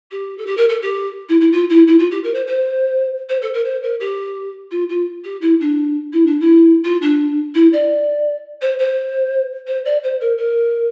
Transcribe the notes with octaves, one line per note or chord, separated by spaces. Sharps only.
G4
A4
G4
A#4
A4
G4
E4
E4
F4
E4
E4
F4
G4
A#4
C5
C5
C5
A4
A#4
C5
A#4
G4
F4
F4
G4
E4
D4
E4
D4
E4
F4
D4
E4
D5
C5
C5
C5
D5
C5
A#4
A#4